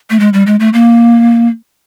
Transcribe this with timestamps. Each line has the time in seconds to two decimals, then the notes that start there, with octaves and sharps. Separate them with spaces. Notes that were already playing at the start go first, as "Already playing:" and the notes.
0.10 A3
0.20 G#3
0.33 G3
0.47 G#3
0.60 A3
0.74 A#3